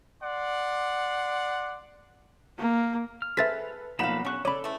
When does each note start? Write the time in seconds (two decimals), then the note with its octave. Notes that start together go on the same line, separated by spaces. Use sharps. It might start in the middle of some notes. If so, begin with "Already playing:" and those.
0.22 D5 F#5 C6
2.59 A#3
3.22 F6
3.37 G#4 A4 B4 C5 E5 A6 B6
3.99 B1 F3 A#3 D#4 F5 F#5 B5 E7
4.25 C#4 D4 G4 C#6 F#6
4.45 C#3 A4 C#5 D5 B5
4.64 E3 A3